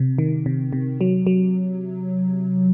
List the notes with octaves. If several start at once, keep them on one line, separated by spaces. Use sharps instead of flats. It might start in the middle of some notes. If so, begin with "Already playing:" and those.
Already playing: C3
D#3
C3
C3
F#3
F#3